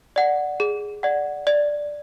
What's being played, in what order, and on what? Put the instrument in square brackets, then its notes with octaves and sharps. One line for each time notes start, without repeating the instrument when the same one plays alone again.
[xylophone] D5 F#5
G#4
D5 F#5
D5